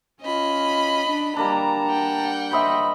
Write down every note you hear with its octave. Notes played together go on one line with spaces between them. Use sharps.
C#4 F4 D#5 B5
D4
G3 A#3 D4 A5 A#5
F#5 G5
C5 D#5 E5 B5